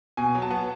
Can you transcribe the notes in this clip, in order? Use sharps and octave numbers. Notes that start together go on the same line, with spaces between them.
B2 G#5
F#3
A5
B3